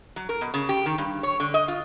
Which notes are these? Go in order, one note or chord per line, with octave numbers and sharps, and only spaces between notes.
F#3
A#4
B2
C#3
G4
D#3
G2
C#5
D3
D#5
F4